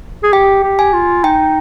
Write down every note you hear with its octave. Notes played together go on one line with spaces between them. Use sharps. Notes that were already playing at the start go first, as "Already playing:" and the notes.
G#4
G4 G5
G4
G#5
F4
D#4 G5